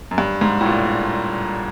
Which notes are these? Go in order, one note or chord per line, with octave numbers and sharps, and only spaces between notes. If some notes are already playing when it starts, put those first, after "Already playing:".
F#2
G2
G#2
A2
A#2